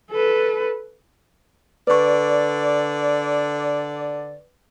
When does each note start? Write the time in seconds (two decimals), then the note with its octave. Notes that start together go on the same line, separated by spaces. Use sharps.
0.11 A4 B4
1.87 D3 B4 D5 C#6